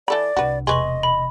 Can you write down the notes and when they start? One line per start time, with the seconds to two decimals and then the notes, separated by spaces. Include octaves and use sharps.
0.08 E3 A4 D5 B5
0.36 C2 D4 F#4 B4
0.67 E1 C3 G#4 B4 D#5 C6 C#6 F#7
1.03 B5